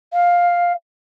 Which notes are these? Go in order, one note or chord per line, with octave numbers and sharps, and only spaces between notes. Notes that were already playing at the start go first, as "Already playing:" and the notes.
F5